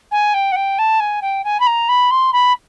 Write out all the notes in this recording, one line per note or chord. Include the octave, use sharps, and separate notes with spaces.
G#5
G5
F#5
G5
A5
G#5
G5
G#5
B5
A#5
B5
C6
B5